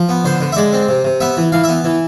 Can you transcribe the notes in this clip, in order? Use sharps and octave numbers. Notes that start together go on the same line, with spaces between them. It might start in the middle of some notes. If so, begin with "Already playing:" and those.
Already playing: F3
B3
D3 C5
D3
E5
G#3 D5
C4
C3
C3
B3 E5
E3
E3 F5
E5
B3
E3